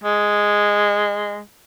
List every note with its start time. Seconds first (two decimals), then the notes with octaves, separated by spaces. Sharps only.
0.04 G#3